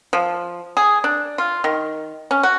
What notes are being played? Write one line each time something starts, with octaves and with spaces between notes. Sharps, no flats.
F3
G#4
D4
F4
D#3
C#4
F#4